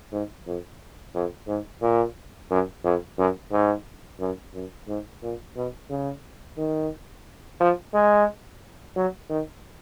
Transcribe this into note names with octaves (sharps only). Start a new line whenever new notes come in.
G#2
F2
F2
G#2
A#2
F#2
F2
F#2
G#2
F#2
F#2
G#2
A#2
B2
C#3
D#3
F3
G#3
F#3
D#3